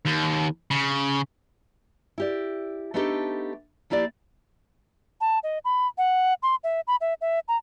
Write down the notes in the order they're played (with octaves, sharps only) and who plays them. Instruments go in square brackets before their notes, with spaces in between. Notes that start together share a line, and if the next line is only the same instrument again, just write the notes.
[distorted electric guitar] D#2
C#3
[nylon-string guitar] E4 G4 D5
A3 B3 D4 D#4 G4 A4
F3 A#3 E4 G4 D5
[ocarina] A5
D#5
B5
F#5
C6
E5
B5
E5
E5
A#5